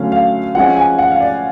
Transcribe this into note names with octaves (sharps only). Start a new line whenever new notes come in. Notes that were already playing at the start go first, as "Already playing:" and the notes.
Already playing: D3 F#3 A3 C#4 F5
F5
F3 G#3 C#4 F#5
G#5
F#5
F5
D5